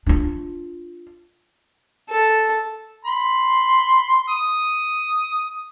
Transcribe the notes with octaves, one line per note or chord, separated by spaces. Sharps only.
D4 F4
A4
B5 C6
D#6